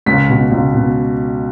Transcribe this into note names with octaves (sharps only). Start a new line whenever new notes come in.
C#2 B6
B2
C#2
B2